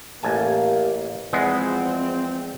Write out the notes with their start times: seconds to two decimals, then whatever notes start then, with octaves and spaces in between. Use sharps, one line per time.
0.23 A1 A#3 G4 G#5 A5
1.33 E2 F3 G#3 B3 C4